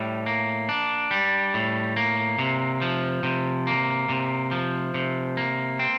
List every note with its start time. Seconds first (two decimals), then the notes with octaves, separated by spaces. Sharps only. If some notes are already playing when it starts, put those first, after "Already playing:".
Already playing: A2 G3
0.26 A#3
0.69 D4
1.11 G3
1.54 A2
1.96 A#3
2.39 C3
2.82 F3
3.23 C3
3.67 A#3
4.09 C3
4.51 F3
4.94 C3
5.37 A#3
5.79 C4